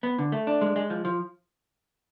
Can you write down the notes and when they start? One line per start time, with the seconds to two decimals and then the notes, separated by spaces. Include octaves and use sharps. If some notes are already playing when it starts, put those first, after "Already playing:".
0.03 B3
0.18 D3
0.32 A3
0.47 D4
0.61 G#3
0.76 G#3
0.90 F3
1.05 F3